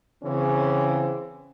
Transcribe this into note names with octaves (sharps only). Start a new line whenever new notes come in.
C#3 E3 C4 C#4